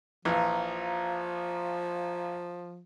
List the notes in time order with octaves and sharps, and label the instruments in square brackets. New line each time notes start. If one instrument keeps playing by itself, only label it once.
[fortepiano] A#1 E3 [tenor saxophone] F3 [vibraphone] F5 A#5